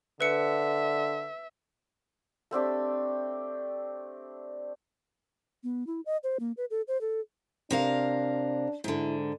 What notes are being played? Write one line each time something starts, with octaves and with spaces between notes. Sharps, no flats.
D3 B4 E5 C#7
A3 C4 D4 G4
B3
E4
D#5
C5
A#3
B4
A4
C5
A4
C3 D4 A#4 F5
G#2 D3 E4